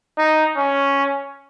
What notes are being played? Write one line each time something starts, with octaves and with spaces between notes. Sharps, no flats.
D#4
C#4